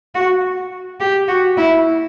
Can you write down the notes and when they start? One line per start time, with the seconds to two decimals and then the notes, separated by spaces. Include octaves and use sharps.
0.15 F#4
1.00 G4
1.28 F#4
1.57 E4